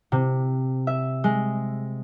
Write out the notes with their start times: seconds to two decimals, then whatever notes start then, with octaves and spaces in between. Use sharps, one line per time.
0.12 C3
0.87 E5
1.24 G#3